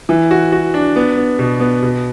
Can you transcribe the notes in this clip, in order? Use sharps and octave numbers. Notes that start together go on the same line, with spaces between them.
E3
F#4
F#4
D4
B3
B3
B2
B3
B2